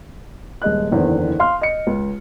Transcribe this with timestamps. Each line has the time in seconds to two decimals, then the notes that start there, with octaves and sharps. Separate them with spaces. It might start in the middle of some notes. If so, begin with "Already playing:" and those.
0.62 D#1 G#3 D#5 F#6
0.92 F#1 E2 D3 D#3 C5
1.40 F5 C6 F6
1.61 D#5 C#7
1.87 C#2